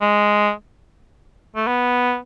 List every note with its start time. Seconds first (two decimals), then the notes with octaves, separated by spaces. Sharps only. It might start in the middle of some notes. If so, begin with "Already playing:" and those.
0.02 G#3
1.56 A3
1.67 B3